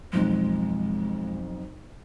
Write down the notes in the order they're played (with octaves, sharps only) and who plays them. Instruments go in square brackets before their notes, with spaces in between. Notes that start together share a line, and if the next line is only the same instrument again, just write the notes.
[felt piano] B1 F2 [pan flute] G#3